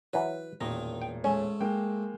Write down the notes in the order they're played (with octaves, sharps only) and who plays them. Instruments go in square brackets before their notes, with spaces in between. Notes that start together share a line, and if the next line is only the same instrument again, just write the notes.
[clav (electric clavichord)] E3 F#3 [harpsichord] B4
[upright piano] E1 A1 A#2 [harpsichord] D#3 D#4 [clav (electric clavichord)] A#5
[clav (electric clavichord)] G5
[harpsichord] G#2 A3 [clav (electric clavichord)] C#4
[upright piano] G#3 A#3 G5